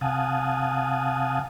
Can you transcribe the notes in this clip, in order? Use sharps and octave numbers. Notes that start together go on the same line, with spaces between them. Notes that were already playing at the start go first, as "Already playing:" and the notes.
C3 F5 F#5 G#5 A5 D#6